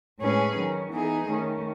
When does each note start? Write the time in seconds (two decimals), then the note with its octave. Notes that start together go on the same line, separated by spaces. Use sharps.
0.20 A2 G#3 C#4 G#4 B4
0.55 D#3 F#3 C#4
0.92 E3 B3 D#4 G#4
1.27 D#3 A3 C#4